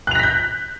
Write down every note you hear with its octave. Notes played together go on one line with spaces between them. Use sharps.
F#6 G6 A#6 B6 F7